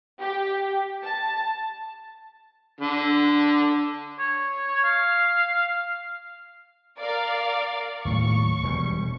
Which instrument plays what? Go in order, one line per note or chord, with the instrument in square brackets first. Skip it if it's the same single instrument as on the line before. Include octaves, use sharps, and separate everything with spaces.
[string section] G4
A5
[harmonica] D3
[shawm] C#5
F5
[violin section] A#4 D5 F5
[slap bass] D#2 A2 F#3 [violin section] C#6
[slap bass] E1 B2 G3